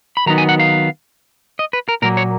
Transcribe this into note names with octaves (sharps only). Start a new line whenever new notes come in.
B5
D#3 F#3 B3 D#4 A#5
G#5
F#5
F5
D#5
B4
A#4
A#2 F#3 A#3 A#4
C#5